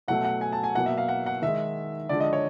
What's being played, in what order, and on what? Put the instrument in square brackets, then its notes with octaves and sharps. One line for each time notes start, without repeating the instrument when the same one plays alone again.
[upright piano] B2 F#3 A3 F#5
F#5
G#5
A5
G#5
B2 F#3 A#3 F#5
E5
F5
F#5
F#5
D#3 G#3 E5
D3 F3 G#3 D5
D#5
C#5